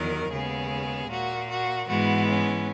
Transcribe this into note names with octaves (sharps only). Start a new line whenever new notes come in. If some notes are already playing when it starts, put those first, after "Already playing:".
Already playing: E2 D#3 F#3 A#4
D#2 C#3 G#3 B3 G#4
A#2 A#3 F#4
F#4
G#2 E3 G#3 B3 F#4
C#4